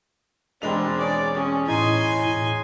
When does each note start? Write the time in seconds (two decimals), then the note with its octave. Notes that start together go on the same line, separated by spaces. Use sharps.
0.62 E1 G#3 C4 D4 B4 A#5 F7
0.98 G#4 C#5 D5 A5
1.35 C#4 G#4 C#5
1.68 A2 D#4 G#5 C6